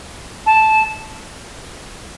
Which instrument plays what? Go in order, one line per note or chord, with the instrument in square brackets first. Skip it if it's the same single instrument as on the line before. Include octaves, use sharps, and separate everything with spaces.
[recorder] A5